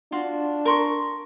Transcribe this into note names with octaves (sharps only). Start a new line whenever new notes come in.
D4 F4 F#4
A#4 C6 C#6